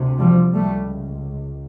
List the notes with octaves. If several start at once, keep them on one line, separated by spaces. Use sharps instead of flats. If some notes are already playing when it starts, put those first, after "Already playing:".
Already playing: D2 C3
F3 G3
C#2 G3 A3